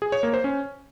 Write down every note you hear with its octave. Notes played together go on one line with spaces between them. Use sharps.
G#4
C#5
A#3
C5
C#4